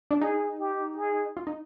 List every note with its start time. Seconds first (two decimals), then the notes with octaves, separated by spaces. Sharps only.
0.11 D4
0.21 D#4 G#4
0.59 G4
0.97 G#4
1.37 F4
1.47 D#4